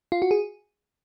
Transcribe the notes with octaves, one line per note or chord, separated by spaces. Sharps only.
F4
F#4
G#4